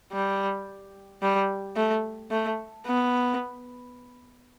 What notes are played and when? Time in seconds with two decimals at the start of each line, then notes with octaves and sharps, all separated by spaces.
0.12 G3
1.22 G3
1.76 A3
2.31 A3
2.86 B3